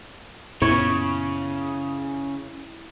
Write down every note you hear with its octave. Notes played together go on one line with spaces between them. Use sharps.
F#2 A#2 C#3 B3 E4 C#5